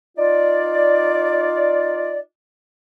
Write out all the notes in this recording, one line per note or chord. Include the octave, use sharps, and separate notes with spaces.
D#4 F4 D5